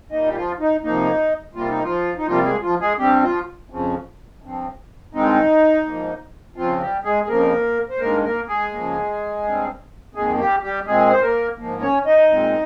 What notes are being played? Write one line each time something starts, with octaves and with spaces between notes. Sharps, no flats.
A#2 G3 A#3 D#4 D#5
G4
F3 F4
D#4
C3 F3 A#3 D#4
C3 G3 A#3 F4
D#4
F3 F4
D#4
C3 F3 G3 A#3 F4
G#3 G#4
F3 F4
G#3 G#4
G2 G3 C4 G4
F3 F4
F2 C#3 F3
G2 F3 C4
G2 D#3 G#3 C4 D#4
G#2 F3 A#3
C#3 F3 C4 F4
G3 G4
G#3 G#4
G#4
F2 C#3 F3 A#3 A#4
C5
G2 D#3 G#3 A#3 A#4
A#3 A#4
G#3 G#4
C#3 F3 A#3
G2 G3 C4
F2 D#3 G#3 A#3 G#4
G3 G4
G3 G4
A#2 G#3 C4 G#4
C5
A#3 A#4
G#2 F3 A#3
C#4 C#5
D#4 D#5
A#2 G#3 C4